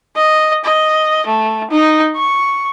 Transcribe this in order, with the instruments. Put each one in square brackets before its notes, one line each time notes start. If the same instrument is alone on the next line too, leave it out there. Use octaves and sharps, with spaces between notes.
[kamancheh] D#5
D#5
A3
D#4
C#6